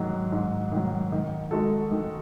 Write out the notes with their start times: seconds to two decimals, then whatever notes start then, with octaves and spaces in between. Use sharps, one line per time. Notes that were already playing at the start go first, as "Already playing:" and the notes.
Already playing: G#2 D#3 F#3
0.32 G#2
0.72 D#3 F#3
1.12 D#3
1.51 G#3 D#4 F#4 A4
1.91 D#3